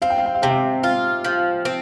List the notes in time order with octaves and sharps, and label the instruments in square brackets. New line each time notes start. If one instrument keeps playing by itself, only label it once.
[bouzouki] C4 [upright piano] F5
[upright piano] G5
F5
G5
F5
[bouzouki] C3 [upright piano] G5
[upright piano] F5
[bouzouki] F4 [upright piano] F5
[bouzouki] F3
C4